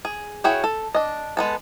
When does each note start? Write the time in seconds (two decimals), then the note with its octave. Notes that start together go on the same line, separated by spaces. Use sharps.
0.05 G#4
0.44 E4 F#4 G#4 C#5 G5
0.64 A4
0.95 D4 D#5
1.37 G#3 B3 A4